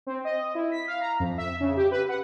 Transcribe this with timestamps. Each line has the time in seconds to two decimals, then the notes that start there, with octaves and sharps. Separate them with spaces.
0.07 C4
0.25 D#5
0.55 E4
0.72 B6
0.87 F5
1.01 A#5
1.20 F2
1.38 E5
1.60 C#3
1.77 G4
1.91 B4
2.09 F#5